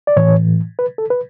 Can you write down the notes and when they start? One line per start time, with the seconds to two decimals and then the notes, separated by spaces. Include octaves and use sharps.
0.07 D5
0.16 A2 E3 C#5
0.79 B4
0.98 A4
1.10 B4